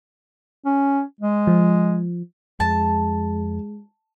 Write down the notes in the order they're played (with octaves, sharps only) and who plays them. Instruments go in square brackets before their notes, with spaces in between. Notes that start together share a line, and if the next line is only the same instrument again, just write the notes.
[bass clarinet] C#4
G#3
[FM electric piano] F3
[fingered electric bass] F2 [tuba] G#3 [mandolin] A5